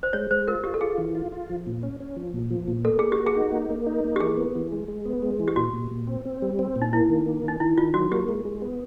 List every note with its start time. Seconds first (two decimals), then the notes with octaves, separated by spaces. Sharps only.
0.03 C5
0.13 G#3 C#5
0.31 G#3 C5
0.48 F4 A#4
0.64 F4 G4
0.74 A4
0.81 F4 G#4
0.98 E3
1.15 F4
1.32 F4
1.50 F3
1.67 A#2
1.83 C#4
2.00 C#4
2.16 F3
2.34 A#2
2.50 F3
2.68 A#2
2.85 A#3 A4
2.99 A#3 G#4
3.12 G4
3.18 F#4
3.26 G#4
3.35 D#4
3.52 A#3
3.70 A#3
3.86 D#4
4.04 A#3
4.16 G4
4.20 E3 G#4
4.37 B3
4.55 E3
4.72 G#3
4.88 G#3
5.05 B3
5.22 G#3
5.40 E3
5.48 G4
5.56 A#2 F#4
5.74 A#2
5.91 A#2
6.07 C4
6.25 C4
6.42 G3
6.59 C4
6.76 A#2
6.82 D#4
6.93 A#3 E4
7.09 D#3
7.26 A#3
7.44 D#3 D#4
7.60 D#3 E4
7.78 D#3 F4
7.94 F#3 F#4
8.11 A#3 G4
8.29 G#3
8.45 G#3
8.62 B3